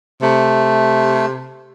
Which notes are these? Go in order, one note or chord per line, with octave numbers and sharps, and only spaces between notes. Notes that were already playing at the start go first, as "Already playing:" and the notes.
C3 A3